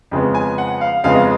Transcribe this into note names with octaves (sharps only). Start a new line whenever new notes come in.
F2 C#3 G#3 B3
G#5
F#5
F5
F2 C#3 G#3 B3 F5
D#5